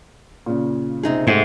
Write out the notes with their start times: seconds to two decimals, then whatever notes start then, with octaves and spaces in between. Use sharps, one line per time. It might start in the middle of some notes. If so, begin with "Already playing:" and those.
0.46 A#2 C#3
1.03 C3 D#4 G#4
1.27 G#2 C3 A3